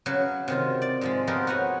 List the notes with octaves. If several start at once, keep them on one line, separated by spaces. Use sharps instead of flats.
C#3 F#3 B4
C3 D#3 F4
D5
G#2 F3 G#3
F3 B3 D#4 G4 A#4 C5
F#4 B4 C#5 F#5 G#5